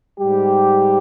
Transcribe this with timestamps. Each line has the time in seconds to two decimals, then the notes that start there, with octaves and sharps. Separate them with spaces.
0.20 G#2 G3 G4